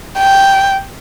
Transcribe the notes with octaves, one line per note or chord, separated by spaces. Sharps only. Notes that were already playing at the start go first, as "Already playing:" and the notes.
G5